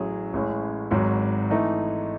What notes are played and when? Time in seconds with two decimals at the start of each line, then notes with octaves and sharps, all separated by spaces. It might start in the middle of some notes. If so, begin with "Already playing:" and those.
Already playing: A1 A2 F#3 C#4 G#4
0.33 A1 A2 G#3 C#4
0.91 G#1 G#2 F#3
1.50 E3 A3 D#4